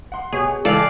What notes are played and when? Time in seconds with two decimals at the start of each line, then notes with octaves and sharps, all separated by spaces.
0.12 F#5 C6
0.32 B2 G4 G#4 C#5
0.65 C#2 E3 A4 D5 F5